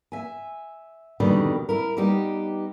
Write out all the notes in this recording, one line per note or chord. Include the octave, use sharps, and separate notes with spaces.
E5 G#5
F2 B2 D3 D#3 G3
E4 A#4
G3 B3 D#4 G4